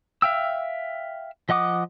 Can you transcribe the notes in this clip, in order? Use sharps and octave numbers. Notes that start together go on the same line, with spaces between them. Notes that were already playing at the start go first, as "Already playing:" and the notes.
E5 F5 G5 E6
F3 D#5 F#5 D6 D#6